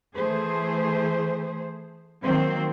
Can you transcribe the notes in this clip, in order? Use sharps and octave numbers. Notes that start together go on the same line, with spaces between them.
E3 A3 G#4 C5
D#3 F#3 A#3 C4 C5